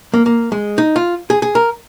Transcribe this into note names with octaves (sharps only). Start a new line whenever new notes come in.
A#3
A#3
G#3
D#4
F4
G#4
G#4
A#4